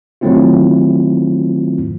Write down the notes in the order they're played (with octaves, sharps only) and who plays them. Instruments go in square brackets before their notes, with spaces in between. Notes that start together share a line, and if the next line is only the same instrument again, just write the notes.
[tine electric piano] D#3 F#3 A3 C4 E4 F4